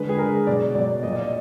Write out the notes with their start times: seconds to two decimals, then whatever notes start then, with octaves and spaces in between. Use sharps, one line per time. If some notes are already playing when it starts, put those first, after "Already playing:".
Already playing: D3 G#3 B4
0.09 G#4
0.18 D3 G#3 A#4
0.47 B2 F#3 D5
0.75 B2 F#3 D5
1.03 A#2 F#3 D#5
1.12 D5
1.22 D#5